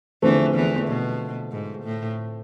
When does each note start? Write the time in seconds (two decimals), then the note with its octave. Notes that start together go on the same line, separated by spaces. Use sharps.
0.22 E2 D3 E3 F3 A3 C4
0.56 E2 E3
0.87 B2
1.52 G#2
1.84 A2